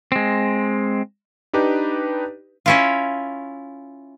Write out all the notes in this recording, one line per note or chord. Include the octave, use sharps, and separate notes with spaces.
G#3 C4
D4 D#4 G4 B4
C#4 E4 F4